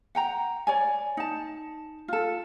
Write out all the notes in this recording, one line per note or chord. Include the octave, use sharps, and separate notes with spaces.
F#5 G5 A#5
C#5 D5 G#5
D#4 A5
F4 A4